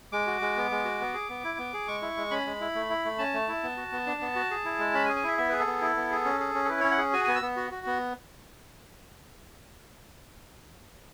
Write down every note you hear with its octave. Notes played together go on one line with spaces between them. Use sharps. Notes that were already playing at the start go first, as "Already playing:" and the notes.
G#3 D6
F#4
G#3
B3
G#3
F#4
B3
G#4
B3
E4
B3
G#4
G#3 C#6
E4
G#3
C#4 B5
G#3
E4
A3
E4
A3
C#4 A5
A3
E4
B3
F#4
B3
D4
B3
F#4
G#4
E4
G#3
C#4 B5
G#5
G#4
G#5
E4 E5
B3 E5
G#4 B4
A4
B3
E4
B3
G#4
C#4
G#4
C#4
A4
E4 B4
C#4 C#5
F#5
G#4
F#4 G#5
B3 G#5
E6
B3
F#4
F#4
B3